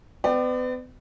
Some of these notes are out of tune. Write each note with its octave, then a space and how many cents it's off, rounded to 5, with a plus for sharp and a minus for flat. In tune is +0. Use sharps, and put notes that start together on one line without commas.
B3 +40 D5 +30 G5 -35